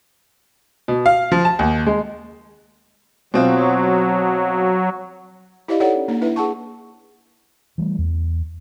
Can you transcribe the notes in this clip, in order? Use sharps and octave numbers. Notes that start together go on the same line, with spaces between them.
B2
F5
F3
A5
D#2
G#3
B2 F#3 C4 F4
E4 G4 C5 D5 D#5 F5
D#4 A4 C#5 D5 F#5
C#4
A#3 D4 D#4
D4 E4 B4 E5
G#4 F#5 A5 C#6
E3 G3 A3
E2